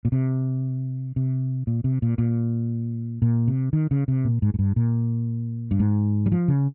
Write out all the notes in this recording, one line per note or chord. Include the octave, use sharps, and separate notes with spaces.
A#2
C3
C3
A#2
C3
A#2
A#2
A#2
C3
D#3
C#3
C3
A#2
G#2
G#2
G2
A#2
G2
G#2
G3
F3
C#3